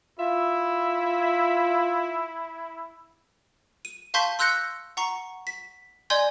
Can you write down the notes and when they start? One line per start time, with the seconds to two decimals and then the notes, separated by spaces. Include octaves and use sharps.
0.19 E4 F4 E5
3.85 D#7
4.14 F5 A5 C6 C#6 G6 B6
4.39 C6 E6 F#6 G6 A#6 C#7
4.97 F#5 A#5 C#6
5.47 B6
6.10 D5 D#5 G#5 C6 G6 G#6